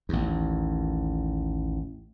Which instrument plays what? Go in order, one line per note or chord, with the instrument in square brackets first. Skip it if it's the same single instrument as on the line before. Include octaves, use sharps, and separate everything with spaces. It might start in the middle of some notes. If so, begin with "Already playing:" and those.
[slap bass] A1 D#2